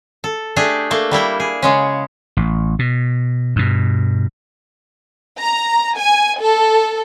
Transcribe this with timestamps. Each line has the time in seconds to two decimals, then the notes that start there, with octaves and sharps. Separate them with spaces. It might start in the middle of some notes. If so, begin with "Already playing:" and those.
0.24 A4
0.56 A3 D4 G4 G#4
0.91 A3 A#3
1.11 G3 A#3 E4 G5
1.40 G#4
1.62 C#3 G#3 C#4
2.37 A1
2.79 B2
3.56 G2 B2
5.38 A#5
5.95 G#5
6.39 A4